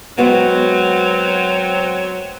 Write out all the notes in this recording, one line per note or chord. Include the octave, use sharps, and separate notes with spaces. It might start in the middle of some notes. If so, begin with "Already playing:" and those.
F#3 G#3 B3 C4 F#4